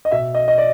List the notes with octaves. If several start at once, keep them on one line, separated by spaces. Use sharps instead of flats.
D#5
B2 E5
D#5
D#5
D5